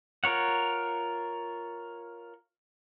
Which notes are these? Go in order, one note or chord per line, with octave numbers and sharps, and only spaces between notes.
F4 A#4 C#5 F#5